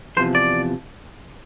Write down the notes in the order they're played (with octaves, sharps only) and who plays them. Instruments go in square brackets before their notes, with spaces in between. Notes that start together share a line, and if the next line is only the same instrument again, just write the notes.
[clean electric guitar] E2 C3 F3 C5
D5